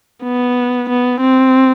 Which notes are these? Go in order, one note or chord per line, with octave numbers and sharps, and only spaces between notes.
B3
B3
C4